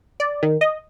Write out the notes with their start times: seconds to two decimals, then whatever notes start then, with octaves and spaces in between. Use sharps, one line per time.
0.20 D5
0.43 D#3
0.61 D#5